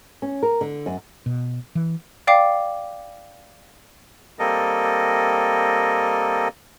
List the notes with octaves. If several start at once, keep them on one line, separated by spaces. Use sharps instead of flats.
C#4
A#4
D3
F#2
B2
E3
D5 F5 G5 D6 C7
G3 A#3 C4 A4 A#4 D#5